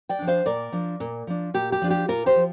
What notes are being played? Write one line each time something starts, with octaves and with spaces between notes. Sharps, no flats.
D5 G5
F3 D4
C5 F5
A#2 A#4 D5
F3 D4
A#2
F3 D4
A#2 G4
G4
F3 D4
G4
A#2 F4 A#4
G4 C5
F3